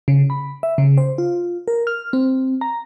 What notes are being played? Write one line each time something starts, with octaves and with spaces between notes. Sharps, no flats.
C#3
B5
E5
C#3
C5
F4
A#4
F6
C4
A#5